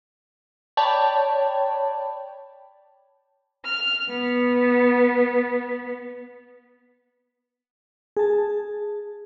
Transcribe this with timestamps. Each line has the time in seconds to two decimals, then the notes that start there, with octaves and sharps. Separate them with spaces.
0.77 C#5 D5 G5 A5 B5
3.64 F6
4.09 B3
8.17 G#4 A5